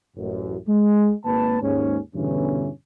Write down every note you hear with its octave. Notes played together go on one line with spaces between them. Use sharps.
A1 F#2
G#3
G#1 A#3 B4 A5
D#2 G#2 C#4
E2 G2 B2 D3 E3 C#4